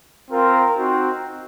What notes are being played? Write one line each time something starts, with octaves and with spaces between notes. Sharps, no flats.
C4 F4 A#4
C4 D#4 F#4